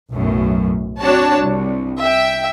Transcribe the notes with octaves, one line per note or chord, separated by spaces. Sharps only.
B1 F#2 A2
C4 D4 F#4 C#5 A5
C2
E5 G5